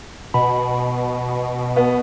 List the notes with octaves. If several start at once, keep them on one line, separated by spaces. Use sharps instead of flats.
B2 B5
B3